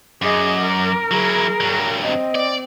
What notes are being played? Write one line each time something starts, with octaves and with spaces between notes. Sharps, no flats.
F#2 G#4 D#5 D6
A#4
F#3 E4 G#4
G2 F#3
C4 D#5
D5